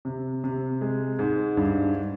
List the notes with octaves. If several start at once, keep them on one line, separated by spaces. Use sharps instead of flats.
C3
C3
G#3
G#2
G2